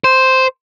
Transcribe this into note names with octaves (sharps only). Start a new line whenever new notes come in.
C5